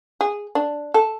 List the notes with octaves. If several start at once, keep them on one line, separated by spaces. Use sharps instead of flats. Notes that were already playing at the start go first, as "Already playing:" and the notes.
G#4
D4
A4